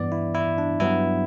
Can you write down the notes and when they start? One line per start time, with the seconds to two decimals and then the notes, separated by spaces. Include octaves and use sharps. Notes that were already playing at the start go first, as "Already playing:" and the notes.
Already playing: G2 E3 B3 D5
0.12 E4
0.35 E4
0.58 D4
0.80 G2 F#3 B3 E4